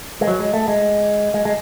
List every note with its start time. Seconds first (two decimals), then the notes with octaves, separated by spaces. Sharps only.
0.21 G#3
0.27 F#3
0.40 G#3
0.53 A3
0.68 G#3
1.34 G#3
1.45 G#3